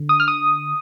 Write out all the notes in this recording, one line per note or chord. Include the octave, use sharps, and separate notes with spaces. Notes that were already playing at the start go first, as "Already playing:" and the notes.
Already playing: D3
D#6
F6
D#6